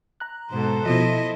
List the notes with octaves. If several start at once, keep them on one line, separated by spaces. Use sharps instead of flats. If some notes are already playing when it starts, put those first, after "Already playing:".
A#5 F#6
G#2 B2 A4 C5
B2 F3 E4 D#5